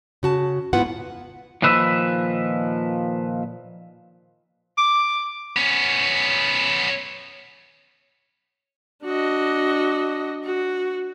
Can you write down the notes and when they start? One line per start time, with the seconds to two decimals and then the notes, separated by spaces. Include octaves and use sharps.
0.23 C#3 F#4 A5
0.73 G#2 B3 E4 F4 B4 F#5
1.62 A#2 D#3 F3 B4 E5
4.78 D6
5.56 B3 C#4
9.05 D4 F#4 D#5
10.44 F#4